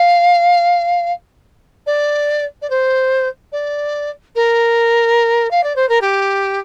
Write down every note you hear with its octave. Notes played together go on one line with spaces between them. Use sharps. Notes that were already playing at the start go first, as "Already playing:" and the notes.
Already playing: F5
D5
D5
C5
D5
A#4
F5
D5
C5
A#4
G4